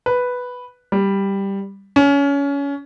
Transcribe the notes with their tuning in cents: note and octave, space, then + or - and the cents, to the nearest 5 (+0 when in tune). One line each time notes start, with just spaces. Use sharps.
B4 +0
G3 +5
C#4 +25